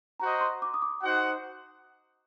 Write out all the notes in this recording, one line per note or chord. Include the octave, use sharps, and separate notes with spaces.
F#4 C5 D#5 A#5
C6
D6
D#6
D6
D#4 F#4 C5 F#5